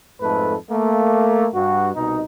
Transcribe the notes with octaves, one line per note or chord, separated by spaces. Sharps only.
F2 G#2 A3 A4 B4
A3 A#3
G2 F#4
C2 B2 D#4